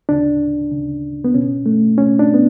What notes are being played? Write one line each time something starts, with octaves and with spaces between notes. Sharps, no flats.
D2 C#3 D4
D2 C#3
B3
C#2 B2 C#4
A3
C#2 B2 C#4
D4
B3